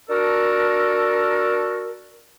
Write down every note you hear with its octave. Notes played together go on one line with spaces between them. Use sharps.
D4 F#4 A4 A#4